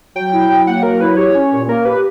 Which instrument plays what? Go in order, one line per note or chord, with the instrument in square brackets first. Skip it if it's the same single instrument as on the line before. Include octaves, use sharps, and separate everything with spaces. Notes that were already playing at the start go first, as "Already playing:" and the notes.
[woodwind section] F#3 [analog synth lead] G5
[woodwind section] E4
F#3
[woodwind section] A#3 [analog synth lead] F#5
[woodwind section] F#3 [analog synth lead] A#4
[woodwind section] E4 [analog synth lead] B4
[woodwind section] G4 [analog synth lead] C#5
[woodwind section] C#4
A#2
[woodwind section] A#3 [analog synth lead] A#4
[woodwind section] G4 [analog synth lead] B4